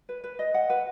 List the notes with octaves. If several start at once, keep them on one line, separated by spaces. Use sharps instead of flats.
B4
B4
D#5
F#5
B4